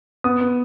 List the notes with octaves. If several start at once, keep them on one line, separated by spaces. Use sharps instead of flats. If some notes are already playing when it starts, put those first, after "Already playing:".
B3 D#6
B3